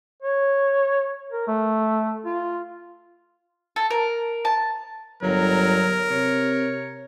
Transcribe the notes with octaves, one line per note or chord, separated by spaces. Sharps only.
C#5
A#4
A3
F4
A4
A#4
A5
G1 F#3 A#4
C3 C#5